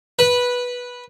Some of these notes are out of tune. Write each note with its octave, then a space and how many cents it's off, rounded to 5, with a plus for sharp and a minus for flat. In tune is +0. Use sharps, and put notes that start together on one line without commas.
B4 -10